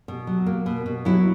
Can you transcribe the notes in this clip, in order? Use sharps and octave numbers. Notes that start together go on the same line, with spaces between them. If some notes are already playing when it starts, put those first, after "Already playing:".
B2
F#3
A#3
B2
B2
F#3 E4